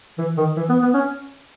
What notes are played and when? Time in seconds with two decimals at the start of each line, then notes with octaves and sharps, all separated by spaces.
0.18 E3
0.37 D#3
0.56 E3
0.69 B3
0.82 B3
0.94 C#4